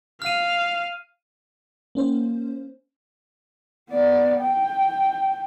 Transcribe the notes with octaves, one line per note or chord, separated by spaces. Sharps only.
F5 F6 D#7
A#3 C#4 C5
B3 D5
G5